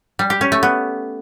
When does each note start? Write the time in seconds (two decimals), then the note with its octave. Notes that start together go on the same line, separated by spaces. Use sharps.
0.19 G3
0.30 G4
0.41 C#4
0.52 A3
0.63 B3